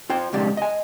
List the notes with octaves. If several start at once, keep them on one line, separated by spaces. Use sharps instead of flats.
F4 C5 G5
B1 F2 C#3 G#3 G4 D5
D#5 G#5